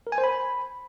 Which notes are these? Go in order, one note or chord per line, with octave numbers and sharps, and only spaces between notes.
A#4
G#5
C5
B5